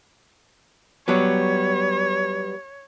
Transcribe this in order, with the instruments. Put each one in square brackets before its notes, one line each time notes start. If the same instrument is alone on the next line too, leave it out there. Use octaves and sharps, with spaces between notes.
[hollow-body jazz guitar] F#3 G3 B3 [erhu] C#5